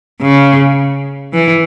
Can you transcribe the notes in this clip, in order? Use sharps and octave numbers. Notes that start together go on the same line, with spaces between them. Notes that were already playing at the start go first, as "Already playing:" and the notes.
C#3
E3